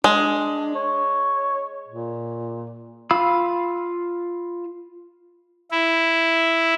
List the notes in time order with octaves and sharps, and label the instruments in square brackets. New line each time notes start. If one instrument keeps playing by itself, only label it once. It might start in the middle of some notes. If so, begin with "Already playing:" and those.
[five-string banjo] G#3 [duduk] D4
[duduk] C#5
A#2
[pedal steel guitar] F4 F5 B5 E6
[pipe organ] E4